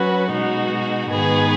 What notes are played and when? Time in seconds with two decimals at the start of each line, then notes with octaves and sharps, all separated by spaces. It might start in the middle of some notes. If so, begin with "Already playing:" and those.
Already playing: F#3 C#4 F#4 B4
0.31 B2 G#3 D#4 F#4
1.10 G#2 D#3 B3 G#4 B4